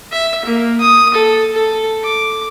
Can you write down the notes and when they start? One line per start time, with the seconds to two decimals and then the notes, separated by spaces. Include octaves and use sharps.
0.12 E5
0.45 A#3
0.81 D#6
1.14 A4
1.53 A4
2.04 D6